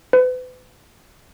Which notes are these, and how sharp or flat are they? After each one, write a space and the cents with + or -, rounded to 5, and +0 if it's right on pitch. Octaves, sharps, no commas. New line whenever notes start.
B4 +40